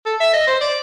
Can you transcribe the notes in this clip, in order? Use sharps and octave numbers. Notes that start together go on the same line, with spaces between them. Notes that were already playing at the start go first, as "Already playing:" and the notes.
A4
E5
D#5
C5
D5